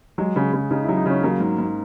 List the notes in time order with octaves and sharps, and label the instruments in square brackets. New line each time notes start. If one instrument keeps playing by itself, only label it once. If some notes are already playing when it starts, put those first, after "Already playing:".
[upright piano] F#3 [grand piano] G#3
[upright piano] C#3
C#3
[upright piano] C#3 [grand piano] D#4
[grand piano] E4
[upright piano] F#3
[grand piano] D#4
[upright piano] C#3 [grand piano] C#4
[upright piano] F#3 [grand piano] A#3
[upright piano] G#2
G#2